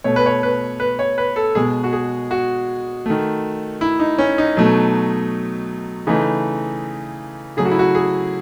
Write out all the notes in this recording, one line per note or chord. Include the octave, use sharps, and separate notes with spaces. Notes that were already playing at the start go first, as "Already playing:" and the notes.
B2 A3 C#5
B4
C#5
B4
B4
C#5
B4
A4
B2 G#3 G#4
F#4
G#4
F#4
D#3 A3
E4
D#4
C#4
D#4
B2 F#3 A3
C#3 E3 A3 D#4
C#3 F#3 A3 G#4
F#4
E4
F#4
G#4